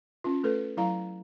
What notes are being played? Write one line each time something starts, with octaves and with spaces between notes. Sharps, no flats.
C#4 F4
A3 A4 B4
F#3 E4 F5 A#5